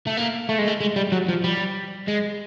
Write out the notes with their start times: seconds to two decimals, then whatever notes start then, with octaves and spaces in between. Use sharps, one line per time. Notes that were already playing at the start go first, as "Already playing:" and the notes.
0.07 A3
0.17 A#3
0.49 A3
0.59 G#3
0.68 A3
0.81 G#3
0.96 G3
1.12 F#3
1.29 F3
1.44 G3
2.08 G#3